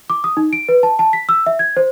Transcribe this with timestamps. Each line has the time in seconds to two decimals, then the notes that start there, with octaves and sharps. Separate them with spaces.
0.10 D6
0.24 D#6
0.37 D#4
0.53 D7
0.69 B4
0.83 A5
0.99 A5
1.13 B6
1.29 E6
1.46 E5
1.59 G#6
1.77 C5